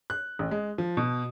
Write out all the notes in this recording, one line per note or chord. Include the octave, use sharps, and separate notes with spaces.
F#6
A1
G#3
F3
B2